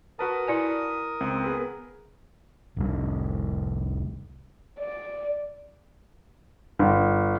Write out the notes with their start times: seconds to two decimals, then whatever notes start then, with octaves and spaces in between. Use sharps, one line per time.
0.19 F#4 A#4 B4 A5 D#6
0.47 E4 D5 G#5
1.21 C#2 C4
1.44 B3 G#4 B4
2.77 F1 C2 G3
4.79 D5
6.79 G1